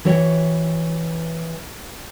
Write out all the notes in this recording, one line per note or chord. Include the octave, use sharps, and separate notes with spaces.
E3 F#4 C#5 G5